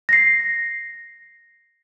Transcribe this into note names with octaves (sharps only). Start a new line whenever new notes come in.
A#6 C7